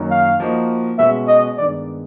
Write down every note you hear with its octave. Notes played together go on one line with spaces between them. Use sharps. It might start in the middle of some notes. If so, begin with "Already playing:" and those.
Already playing: F#2 D#3 F#3 A#3 D#4
F5
F3 A#3 D#4 F#4
B2 G#3 C#4 F#4 B4 E5
D#5
G2 D#3 G#3 B3 D#4 D5